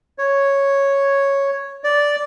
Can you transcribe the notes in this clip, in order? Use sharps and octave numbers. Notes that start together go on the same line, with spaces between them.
C#5
D5